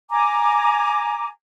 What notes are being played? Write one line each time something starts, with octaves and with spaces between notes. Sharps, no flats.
G#5 A#5 D6